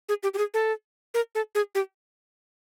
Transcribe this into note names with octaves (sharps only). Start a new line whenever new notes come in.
G#4
G4
G4
G#4
A4
A#4
A4
G#4
G4